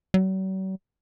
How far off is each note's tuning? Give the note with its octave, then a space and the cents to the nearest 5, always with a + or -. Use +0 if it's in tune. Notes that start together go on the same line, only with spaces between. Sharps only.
F#3 +45